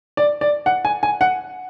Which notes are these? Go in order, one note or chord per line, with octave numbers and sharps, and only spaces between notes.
D5
D5
F#5
G#5
G#5
F#5